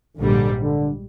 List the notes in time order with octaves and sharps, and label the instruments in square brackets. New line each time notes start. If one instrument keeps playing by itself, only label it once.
[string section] A#1 G#2 G3 [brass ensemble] D3
[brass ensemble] D3